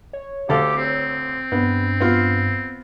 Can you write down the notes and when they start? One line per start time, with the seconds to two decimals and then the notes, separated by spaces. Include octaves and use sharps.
0.13 C#5
0.49 D2 G4 A4 F5
0.76 C4
1.52 G2 B3
2.00 B3 F4